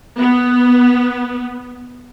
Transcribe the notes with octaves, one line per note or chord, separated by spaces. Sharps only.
B3